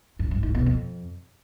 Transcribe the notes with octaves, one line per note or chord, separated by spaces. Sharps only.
F#2
G2
G#2
B2
F2